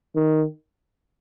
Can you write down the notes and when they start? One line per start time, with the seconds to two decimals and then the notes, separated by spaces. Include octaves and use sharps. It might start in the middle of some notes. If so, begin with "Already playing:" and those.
0.16 D#3